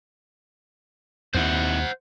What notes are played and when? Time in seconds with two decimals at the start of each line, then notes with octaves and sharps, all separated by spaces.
1.35 D#2 C4 D#4 E4 C5 F#5